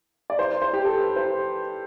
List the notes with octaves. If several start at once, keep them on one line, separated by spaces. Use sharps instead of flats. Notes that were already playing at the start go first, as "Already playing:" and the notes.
D5
C5
C5
G4
A4
B4
C5